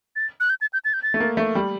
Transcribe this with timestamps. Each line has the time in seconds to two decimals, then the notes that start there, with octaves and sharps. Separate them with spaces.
0.16 A6
0.40 F#6
0.50 G6
0.61 A6
0.73 G6
0.85 A6
0.94 G6
1.03 A6
1.14 A3
1.20 A#3
1.37 A3
1.55 G3